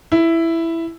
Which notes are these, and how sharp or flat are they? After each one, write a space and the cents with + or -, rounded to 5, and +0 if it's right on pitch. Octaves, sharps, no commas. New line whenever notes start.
E4 +5